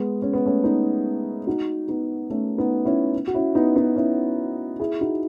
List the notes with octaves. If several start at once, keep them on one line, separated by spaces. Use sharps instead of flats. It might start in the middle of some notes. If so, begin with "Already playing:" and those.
Already playing: G#3 B3
C#4
B3
A3 C#4
B3 D#4
D#4 F#4
B3 D#4
A3 C#4
B3 D#4
C#4 E4
F#4
C#4 E4
B3 D#4
B3 D#4
C#4 E4
E4 G#4
D#4 F#4